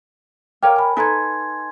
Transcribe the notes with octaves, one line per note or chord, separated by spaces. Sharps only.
A#4 C#5 F5 G5 D6 F6
G#5 B5
D#4 A4 B4 G#5 C6 G#6